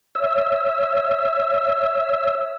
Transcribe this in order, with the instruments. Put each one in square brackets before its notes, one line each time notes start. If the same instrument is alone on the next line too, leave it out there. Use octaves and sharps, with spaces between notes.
[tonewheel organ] C#5 E5 E6